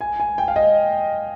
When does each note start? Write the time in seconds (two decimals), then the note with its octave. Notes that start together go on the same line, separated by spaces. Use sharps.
0.01 G#5
0.20 G#5
0.38 G5
0.48 F5
0.56 D#5